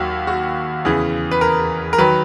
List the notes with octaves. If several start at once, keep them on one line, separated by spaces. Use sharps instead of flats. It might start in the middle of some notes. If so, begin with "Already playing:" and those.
Already playing: D#2 D#3 F#3 F#4
F#4
E2 C#3 E3 G#4
B4
A#4
A#4
D#3 F#3 B4